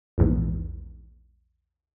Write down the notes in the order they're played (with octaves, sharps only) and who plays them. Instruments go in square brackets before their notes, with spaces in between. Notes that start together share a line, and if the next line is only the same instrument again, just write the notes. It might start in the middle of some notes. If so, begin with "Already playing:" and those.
[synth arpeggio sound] A#1 E2 G#2